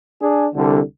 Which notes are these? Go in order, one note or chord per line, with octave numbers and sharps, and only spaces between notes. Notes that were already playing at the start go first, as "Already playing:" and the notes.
D4 G#4
C2 D3